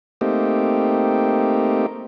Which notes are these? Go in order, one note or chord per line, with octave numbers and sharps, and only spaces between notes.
A3 A#3 C4 D#4 G4